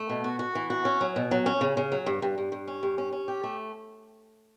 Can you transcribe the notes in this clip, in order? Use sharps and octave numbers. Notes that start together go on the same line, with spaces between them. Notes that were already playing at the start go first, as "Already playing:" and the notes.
Already playing: A3
B2
F#4
F#4
E3
F#4
C#4
F#3
B2
F#3
C#4
C#3
C#3
F#3
G2
G2
G2
G2
C#4
G2
C#4
C#4
G4
A3